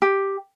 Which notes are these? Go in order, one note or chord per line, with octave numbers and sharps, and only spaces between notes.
G4